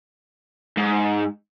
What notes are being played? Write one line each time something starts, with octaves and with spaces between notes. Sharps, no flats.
G#2